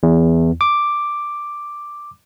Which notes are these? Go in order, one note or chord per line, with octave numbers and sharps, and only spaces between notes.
E2
D6